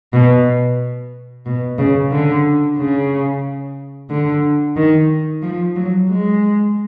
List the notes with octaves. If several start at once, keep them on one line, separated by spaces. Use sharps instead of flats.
B2
B2
C#3
D3
C#3
D3
D#3
F3
F#3
G#3